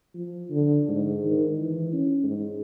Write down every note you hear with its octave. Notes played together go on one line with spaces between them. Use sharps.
F3
D3
G#2
D#3
E3
C#4
G#2